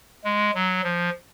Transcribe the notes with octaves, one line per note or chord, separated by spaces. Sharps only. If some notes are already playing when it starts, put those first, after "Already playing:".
G#3
F#3
F3